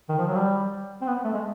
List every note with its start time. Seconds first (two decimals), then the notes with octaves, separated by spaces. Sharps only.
0.09 D#3
0.18 F3
0.27 F#3
0.35 G3
1.01 C4
1.07 B3
1.25 A3
1.33 G#3